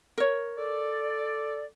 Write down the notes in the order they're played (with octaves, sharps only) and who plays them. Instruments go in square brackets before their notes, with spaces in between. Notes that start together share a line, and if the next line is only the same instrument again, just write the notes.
[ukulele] A#4 C#5
[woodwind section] A4 D5